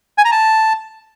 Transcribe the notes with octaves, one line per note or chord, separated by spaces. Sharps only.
G#5
A#5
A5